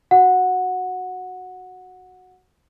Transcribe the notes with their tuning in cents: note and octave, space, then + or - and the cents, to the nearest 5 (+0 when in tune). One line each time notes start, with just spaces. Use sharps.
F#4 +0 F#5 -15